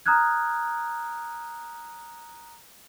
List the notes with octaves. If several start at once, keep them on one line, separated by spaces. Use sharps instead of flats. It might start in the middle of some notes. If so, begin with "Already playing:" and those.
A#5 D#6 F6 F#6 G#6